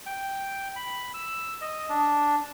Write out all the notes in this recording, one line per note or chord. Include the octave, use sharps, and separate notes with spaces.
G5
B5
E6
D#5
D4